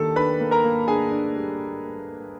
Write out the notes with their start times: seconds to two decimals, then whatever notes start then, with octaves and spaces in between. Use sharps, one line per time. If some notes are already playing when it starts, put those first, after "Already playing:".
Already playing: D#3 A#3 D4 G4 A4 A5
0.16 D4 B4 B5
0.40 A#3
0.51 A#4 A#5
0.64 A#3
0.87 D4 G#4 G#5
1.11 D4
1.36 G3